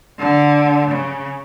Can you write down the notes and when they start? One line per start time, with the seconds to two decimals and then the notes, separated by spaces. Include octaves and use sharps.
0.19 D3
0.91 C#3